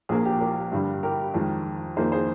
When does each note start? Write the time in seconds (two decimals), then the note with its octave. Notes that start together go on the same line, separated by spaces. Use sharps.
0.09 A#1 A#2 F3 A#3 G#4
0.25 G4
0.40 G4 A#4
0.72 G2 D3 G3
1.03 G4 A#4
1.34 F2 D#3 G#3
1.97 F2 D#3 A#3 D#4 G#4 C5
2.12 G#4 C5